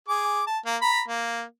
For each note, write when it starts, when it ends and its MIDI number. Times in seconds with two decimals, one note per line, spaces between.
0.09 0.42 68
0.09 0.42 86
0.47 0.59 81
0.66 0.77 58
0.82 1.02 82
0.82 1.02 83
1.08 1.43 58